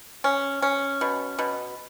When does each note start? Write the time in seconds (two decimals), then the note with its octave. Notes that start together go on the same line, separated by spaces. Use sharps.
0.24 C#4
0.62 C#4
1.01 B2
1.39 B2